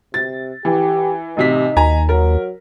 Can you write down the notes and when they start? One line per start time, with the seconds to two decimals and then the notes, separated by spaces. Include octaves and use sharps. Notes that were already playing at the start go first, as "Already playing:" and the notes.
0.14 C3 A6
0.65 E3 G4
1.37 A1 C3 D#4 B6
1.76 D#2 G#5 A#5
2.09 F#3 A#4